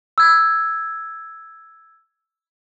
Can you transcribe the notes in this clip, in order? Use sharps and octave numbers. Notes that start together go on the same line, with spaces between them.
E6 G#6